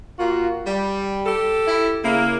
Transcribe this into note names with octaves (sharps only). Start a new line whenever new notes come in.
A#3 F4 F#4
G3
G4 A4
E4
C#3 A#3 E4